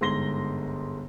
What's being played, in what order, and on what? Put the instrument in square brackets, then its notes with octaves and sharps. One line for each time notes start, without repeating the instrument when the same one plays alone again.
[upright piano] G1 G#2 C6 A#6 G7